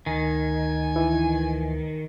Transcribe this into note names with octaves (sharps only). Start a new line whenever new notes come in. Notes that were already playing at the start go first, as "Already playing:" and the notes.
D2 D#3 G#5
E3